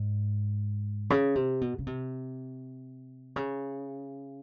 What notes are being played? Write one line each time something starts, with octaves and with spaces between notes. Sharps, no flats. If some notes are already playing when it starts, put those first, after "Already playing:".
Already playing: G#2
C#3
C3
B2
C#3
C3
C#3